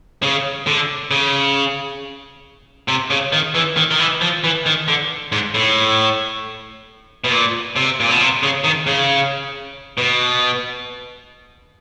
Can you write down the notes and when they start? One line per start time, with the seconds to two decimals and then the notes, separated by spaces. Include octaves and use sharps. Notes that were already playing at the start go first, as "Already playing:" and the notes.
0.22 C#3
0.67 D3
1.11 C#3
2.88 C3
3.10 C#3
3.33 D#3
3.55 E3
3.76 D#3
3.91 D#3
3.99 E3
4.21 F3
4.44 E3
4.66 D#3
4.88 D3
5.32 G#2
5.54 A2
7.24 B2
7.31 A#2
7.76 C3
8.00 A#2
8.10 B2
8.20 C3
8.43 C#3
8.64 D#3
8.87 C#3
9.98 B2